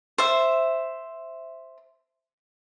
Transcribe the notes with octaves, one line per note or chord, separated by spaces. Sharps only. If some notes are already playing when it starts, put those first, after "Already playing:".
C5 E5